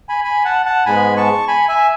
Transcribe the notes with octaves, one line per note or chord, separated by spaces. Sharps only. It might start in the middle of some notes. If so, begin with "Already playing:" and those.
G#5 B5
G#5 B5
F#5 A5
F#5 A5
G#2 G#3 B3 G#5 B5
A5 C#6
G#5 B5
E5 G#5